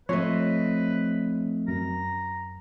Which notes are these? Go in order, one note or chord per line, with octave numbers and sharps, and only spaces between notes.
F3 A3 C4 B4 C#5 D#5
F#2 A#5